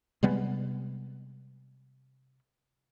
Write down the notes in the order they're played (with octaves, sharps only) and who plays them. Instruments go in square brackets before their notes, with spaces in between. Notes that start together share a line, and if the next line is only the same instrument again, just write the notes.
[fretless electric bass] C3 G3 G#3 B3